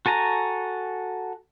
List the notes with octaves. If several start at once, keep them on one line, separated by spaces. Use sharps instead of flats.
F#4 A4 G#5 A#5